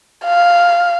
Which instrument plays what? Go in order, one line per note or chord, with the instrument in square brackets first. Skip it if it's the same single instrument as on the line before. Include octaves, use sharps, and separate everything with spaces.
[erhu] F5